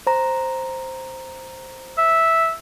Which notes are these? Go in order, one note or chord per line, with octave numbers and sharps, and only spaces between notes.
C5 A#5
E5